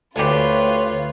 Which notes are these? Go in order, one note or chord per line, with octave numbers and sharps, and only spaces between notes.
D2 D4 F4 G4 B4 C#5 C6